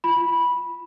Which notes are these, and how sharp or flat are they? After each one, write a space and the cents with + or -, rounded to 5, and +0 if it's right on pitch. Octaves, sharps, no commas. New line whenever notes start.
F4 -35 B5 -10